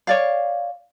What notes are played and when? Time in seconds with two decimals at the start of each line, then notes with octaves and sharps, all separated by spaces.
0.07 C#5 D5 F5